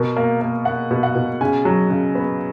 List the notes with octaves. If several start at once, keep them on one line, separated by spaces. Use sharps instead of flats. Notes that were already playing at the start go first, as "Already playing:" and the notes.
Already playing: B2 A#4
A#3
A#3
A#3 F#5
B2
F#5
B2
C#3 G#5
F#3
C#3
B3